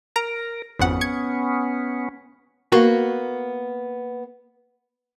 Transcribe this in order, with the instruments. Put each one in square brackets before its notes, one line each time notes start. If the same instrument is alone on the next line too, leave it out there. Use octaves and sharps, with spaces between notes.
[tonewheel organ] A#4 [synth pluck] A#5
[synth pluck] G#1 F2 F#5 [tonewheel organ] B3 C#4
[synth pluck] G#6 C#7
[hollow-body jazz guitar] A#3 B3 F#4